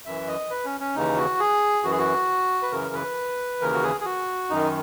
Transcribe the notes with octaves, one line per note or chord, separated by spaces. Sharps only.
F#2 E3 E5
D#5
B4
C#4
C#4
D#2 C#3 E3 D#4
F#4
G#4
F#2 E3 F#4
G#4
F#4
B4
F#2 C#3 E3 A#4
B4
D#2 C#3 E3 A#4
F#4
G#4
G#4
F#4
F#2 D#3 D#4